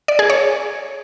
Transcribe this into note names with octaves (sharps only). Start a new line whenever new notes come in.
D5
G#4
C#5